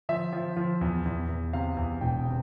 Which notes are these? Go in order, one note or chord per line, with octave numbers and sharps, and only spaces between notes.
F3 E5
F3
F3
E2
E2
E2
C3 F5
E2
E1 G5
C3